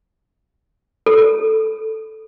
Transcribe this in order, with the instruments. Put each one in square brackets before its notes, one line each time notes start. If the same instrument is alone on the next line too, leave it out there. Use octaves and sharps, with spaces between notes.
[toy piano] A4